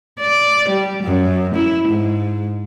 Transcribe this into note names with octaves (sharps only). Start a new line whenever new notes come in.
D5
G3
F#2
E4
G#2